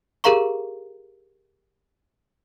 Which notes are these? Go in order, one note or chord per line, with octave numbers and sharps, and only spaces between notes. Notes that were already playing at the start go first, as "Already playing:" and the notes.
G4 G#4 A#4 F5 A#5 C#6